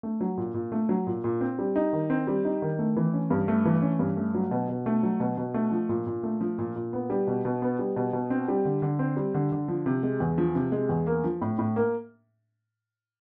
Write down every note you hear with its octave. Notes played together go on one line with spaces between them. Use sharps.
A3
F#3
A#2
A#2
A3
F#3
A#2
A#2
C4
G3
D#4
D#3
C4
G3
D#4
D#3
A3
E3
C#4
G2
A3
E3
C#4
G2
A3
F#3
B2
B2
A3
F#3
B2
B2
A3
F3
A#2
A#2
A3
F3
A#2
A#2
B3
G3
B2
B2
B3
G3
B2
B2
C4
G3
D3
D3
C4
G3
D3
D3
F3
C3
G#3
E2
F3
C3
G#3
E2
A#3
F3
A2
A2
A#3